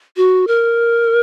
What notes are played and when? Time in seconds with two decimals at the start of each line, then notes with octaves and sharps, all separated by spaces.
0.17 F#4
0.47 A#4